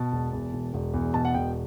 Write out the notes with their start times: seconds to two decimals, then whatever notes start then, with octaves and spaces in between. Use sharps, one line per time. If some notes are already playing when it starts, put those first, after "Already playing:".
Already playing: B2 A5
0.12 E1
0.33 E2
0.53 E1
0.74 E1
0.94 E2
1.14 B2 A5
1.25 F#5
1.34 E1 G5